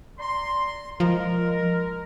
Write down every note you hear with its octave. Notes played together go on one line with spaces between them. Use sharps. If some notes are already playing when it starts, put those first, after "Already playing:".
D5 A#5 C6
F3 G#3 A#4